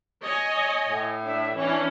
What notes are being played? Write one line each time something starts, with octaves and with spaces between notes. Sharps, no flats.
C#5 D#5 G#5
A2
D4 E5
E3 C#4 D4 C#5